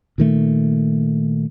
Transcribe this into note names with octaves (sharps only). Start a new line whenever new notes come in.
A#2 D#3 A3